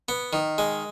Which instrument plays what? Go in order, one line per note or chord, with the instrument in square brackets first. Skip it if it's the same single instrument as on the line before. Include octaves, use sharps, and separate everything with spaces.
[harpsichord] B3
D#3
G#3